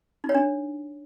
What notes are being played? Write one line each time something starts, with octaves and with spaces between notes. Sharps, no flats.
D#4
C#5
D4